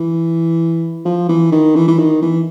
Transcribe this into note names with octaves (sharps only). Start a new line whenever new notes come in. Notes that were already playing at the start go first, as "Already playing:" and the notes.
Already playing: E3
F3
E3
D#3
E3
E3
D#3
E3